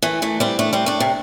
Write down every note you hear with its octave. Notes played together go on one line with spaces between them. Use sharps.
E3 A3
E3 A3
G3 C4
A3 D4
G3 C4
A3 D4
C3